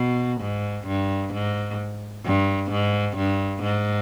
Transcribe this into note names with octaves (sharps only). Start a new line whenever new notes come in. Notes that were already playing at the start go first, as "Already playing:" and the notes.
Already playing: B2
G#2
G2
G#2
G2
G#2
G2
G#2